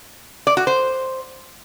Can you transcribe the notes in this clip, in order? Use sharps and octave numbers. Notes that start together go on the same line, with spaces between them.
D5
F#4
C5